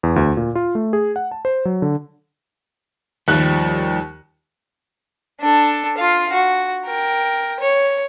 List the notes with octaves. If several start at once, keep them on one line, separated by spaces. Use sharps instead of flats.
E2
D2
A#2
F4
A3
G#4
F#5
A5
C5
F#3
D3
D#2 F3 G3 F#6
D4 A4
F4 F5
F#4
A#4 G5
C#5